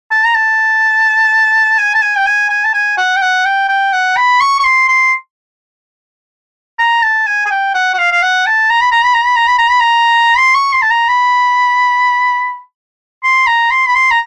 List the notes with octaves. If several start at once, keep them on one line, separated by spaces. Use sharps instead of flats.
A5
A#5
A5
G#5
A5
G#5
G5
G#5
G#5
A5
G#5
F#5
G5
F#5
G5
G5
F#5
B5
C#6
C#6
C6
C6
A#5
A5
G#5
G#5
G5
F#5
F#5
F5
F5
F#5
A5
A#5
B5
A#5
B5
A#5
B5
A#5
B5
A#5
B5
A#5
C6
C#6
C6
A5
A#5
B5
C6
A#5
C6
B5
C6
A#5